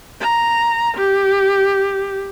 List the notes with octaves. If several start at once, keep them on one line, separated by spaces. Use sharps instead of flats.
A#5
G4